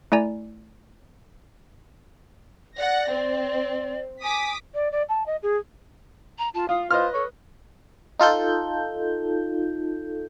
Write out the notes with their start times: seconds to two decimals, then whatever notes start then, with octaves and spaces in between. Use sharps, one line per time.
0.12 A3 E4 D5 G#5 A#5
2.77 D5 F#5 A#6
3.10 C4
4.23 G#5 D6 D#6 B6
4.74 D5
4.92 D5
5.08 A5
5.26 D#5
5.42 G#4
6.38 A#5
6.54 F4 A5
6.69 F4 F5 D#6
6.91 F4 B4 C5 D#5 F6
7.14 A4 C#5
8.19 D#4 F4 A4 G6